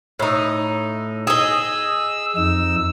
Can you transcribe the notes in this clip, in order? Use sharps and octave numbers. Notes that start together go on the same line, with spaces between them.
A2 D#4
G#4 D#5 E6
F2 D#4 E6